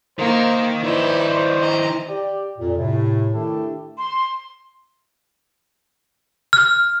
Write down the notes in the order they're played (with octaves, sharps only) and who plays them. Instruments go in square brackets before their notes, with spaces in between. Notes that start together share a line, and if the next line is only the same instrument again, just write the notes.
[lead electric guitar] D#3 D#4 [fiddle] A#3 [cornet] C5
[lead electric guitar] D#3 E4 [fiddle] D#4 B4 [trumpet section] C5 [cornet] D5
[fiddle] D#5 A#5
[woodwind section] G4 D5
F2 A#2
A2 C3
D#3 A3 D4 E4 G4 A4
[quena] C6
[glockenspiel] F6